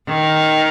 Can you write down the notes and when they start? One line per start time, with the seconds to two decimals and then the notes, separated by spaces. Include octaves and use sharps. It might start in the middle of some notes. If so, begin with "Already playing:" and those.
0.08 D#3